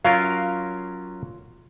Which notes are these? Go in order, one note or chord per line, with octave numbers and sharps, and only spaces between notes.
F#3 C#4 F4 A#4 F5